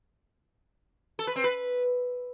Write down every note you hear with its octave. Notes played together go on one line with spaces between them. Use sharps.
A4
B4
C4
B4